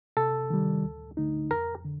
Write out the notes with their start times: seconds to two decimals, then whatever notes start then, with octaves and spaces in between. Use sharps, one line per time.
0.17 C3 A4
0.50 D#3 G3
0.84 D2
1.17 D3 A3 D#4
1.51 F2 A#4
1.85 D3